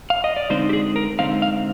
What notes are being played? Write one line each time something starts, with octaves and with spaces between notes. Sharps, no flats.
F5
D#5
D5
D3 G#3 C4 D#4 C5
G4
G#4
A#4
D3 G#3 C4 D#4 F5
F5